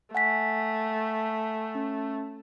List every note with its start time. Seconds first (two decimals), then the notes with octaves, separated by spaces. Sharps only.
0.15 A3 F#5 G#5 B6
1.75 C#4